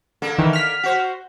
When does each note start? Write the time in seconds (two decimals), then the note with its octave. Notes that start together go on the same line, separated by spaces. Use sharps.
0.22 D3 A#3 A4
0.38 D#3 E3
0.53 F6 B6
0.83 F#4 C5